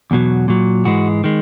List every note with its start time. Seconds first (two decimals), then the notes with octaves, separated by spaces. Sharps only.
0.11 E2 B2 F#3
0.48 A#2 F#3
0.85 G#2 E3 G#3 F#4
1.24 D#3 G#3